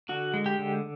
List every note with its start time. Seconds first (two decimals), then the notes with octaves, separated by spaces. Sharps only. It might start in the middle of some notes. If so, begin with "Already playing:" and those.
0.09 D3 F#4
0.34 G#3
0.46 G4
0.59 D3